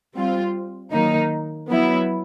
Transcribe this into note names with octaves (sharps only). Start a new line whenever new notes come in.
G3 C4 F4
D#3 F#3 A#3 D#4
F#3 B3 E4